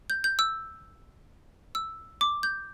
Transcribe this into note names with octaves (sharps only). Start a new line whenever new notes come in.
G6
G6
E6
E6
D6
G6